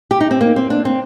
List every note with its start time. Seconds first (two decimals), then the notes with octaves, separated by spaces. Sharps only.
0.11 G4
0.21 D#4
0.31 C4
0.41 A#3
0.56 C4
0.70 D4
0.85 C4